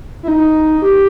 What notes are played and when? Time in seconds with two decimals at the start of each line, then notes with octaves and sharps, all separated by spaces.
0.23 E4
0.28 D#4
0.82 G4